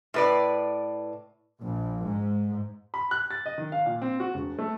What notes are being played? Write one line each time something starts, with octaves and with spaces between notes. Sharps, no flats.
A2 B4 D5
A#1
G#2
B5
F#6
A6
D#5
D#3
F5
A#2
C4
F#4
E1
A3